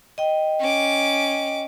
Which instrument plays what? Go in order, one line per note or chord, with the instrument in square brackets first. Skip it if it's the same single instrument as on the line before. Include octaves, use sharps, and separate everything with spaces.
[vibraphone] D#5 G5
[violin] C#4 D6